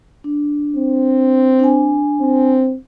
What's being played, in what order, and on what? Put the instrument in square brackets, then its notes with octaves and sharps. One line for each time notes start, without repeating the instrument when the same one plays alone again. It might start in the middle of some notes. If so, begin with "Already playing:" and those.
[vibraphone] D4
[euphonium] C4
[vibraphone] D4 G#5
[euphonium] C4